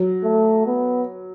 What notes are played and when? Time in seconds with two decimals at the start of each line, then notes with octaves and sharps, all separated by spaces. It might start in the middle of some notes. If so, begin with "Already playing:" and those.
Already playing: F#3
0.24 A3
0.66 B3